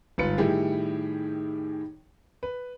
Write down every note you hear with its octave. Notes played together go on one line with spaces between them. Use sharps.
G1 G#2 F4 B4 C#7
A2 D#3 G3 E4 G4 G#4
B4